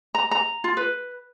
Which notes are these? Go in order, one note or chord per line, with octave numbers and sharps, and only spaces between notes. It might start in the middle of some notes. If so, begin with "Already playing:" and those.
A#5
A#5
F4
B4